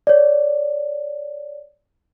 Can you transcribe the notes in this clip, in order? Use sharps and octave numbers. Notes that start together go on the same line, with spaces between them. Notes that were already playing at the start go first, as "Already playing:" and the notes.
C#5 D5